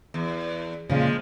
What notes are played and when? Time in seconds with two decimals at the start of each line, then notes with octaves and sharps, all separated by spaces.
0.14 E2
0.89 A#2 C#3 F3 F#3 G#3